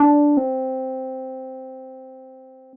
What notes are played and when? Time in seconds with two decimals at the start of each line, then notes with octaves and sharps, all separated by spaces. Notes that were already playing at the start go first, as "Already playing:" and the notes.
Already playing: D4
0.37 C4